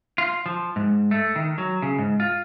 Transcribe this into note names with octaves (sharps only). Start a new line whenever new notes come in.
F4
F3
G#2
A3
D#3
F#3
C#3
G#2
F4